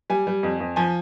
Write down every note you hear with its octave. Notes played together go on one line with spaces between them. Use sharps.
G3 G#5
G3
F2
F2
F3 G#5